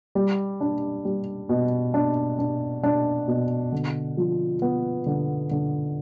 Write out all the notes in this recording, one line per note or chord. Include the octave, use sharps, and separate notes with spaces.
G3
D4
G3
B2
D4
D4
D4
B2
D3
F3
B3
D3
D3